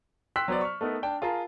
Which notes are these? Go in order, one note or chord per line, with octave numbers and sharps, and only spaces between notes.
G5 C6 E6 F#6 B6
F#3 B3 C5 D5
C#6 F6
A3 B3 D#4 A#4
D4 G5 A5
F4 G#4 A#4 A5 A#5